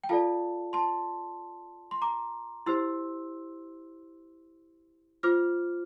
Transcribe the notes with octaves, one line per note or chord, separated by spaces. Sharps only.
G5
F4 A4 D5 F5 A5
A5 C6
C6
A#5 D6
E4 G4 C5 C6 E6
F4 C5 D6 F6